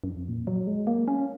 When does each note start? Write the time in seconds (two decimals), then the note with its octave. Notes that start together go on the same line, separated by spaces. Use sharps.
0.04 F#2
0.09 F2
0.28 A#2
0.47 F#3
0.67 G#3
0.87 A#3
1.08 C#4